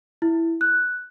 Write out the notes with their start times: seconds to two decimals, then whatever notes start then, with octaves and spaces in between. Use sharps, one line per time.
0.22 E4
0.61 F#6